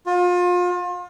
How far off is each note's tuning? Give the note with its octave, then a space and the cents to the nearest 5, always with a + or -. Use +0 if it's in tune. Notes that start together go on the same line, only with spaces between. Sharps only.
F4 +35